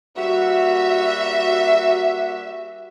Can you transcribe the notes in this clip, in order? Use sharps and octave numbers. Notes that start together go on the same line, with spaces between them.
G3 A#3 F#4 E5